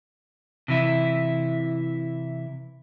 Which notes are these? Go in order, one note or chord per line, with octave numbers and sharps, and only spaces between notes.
C3 E3 E4